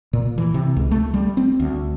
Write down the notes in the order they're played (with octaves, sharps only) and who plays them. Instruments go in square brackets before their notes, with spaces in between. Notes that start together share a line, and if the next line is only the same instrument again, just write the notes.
[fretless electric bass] A#2
E3
C3
C#2
A3
G3
C4
D2